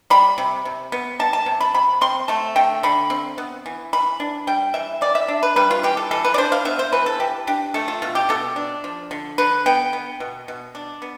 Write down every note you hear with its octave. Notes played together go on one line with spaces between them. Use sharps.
G3 B5
C3
C3
B3
G3 A5
A5
C3
B5
C3 B5
C4 C6
A3 A5
D3 G5
D3 B5
C4
B3
E3
E3 B5
D4
G3 G5
E3 E5
E3 D5
E5
D4
B4
G3 B4
F4
E3 G4
A4
E3 A4
B4
D5
D4 C5
F5
B3 E5
C5
E3 B4
A4
E3 G4
D4 G4
A3 A4
F4
B2 F4
G4
B2 A4
D4
F3
D3
D3 B4
B3 G5
B3
B2
B2
D4
B3